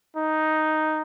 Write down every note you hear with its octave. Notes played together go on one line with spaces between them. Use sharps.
D#4